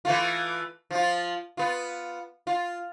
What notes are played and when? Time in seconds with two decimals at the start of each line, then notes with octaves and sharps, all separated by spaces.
0.05 E3 A3 F4
0.91 F3 F4
1.57 B3 F4
2.47 F4